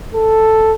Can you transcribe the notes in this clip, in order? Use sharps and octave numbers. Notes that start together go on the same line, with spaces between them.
A4